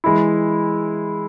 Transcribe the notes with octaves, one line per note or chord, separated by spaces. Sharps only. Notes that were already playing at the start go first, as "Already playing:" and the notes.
E3 G#3 E4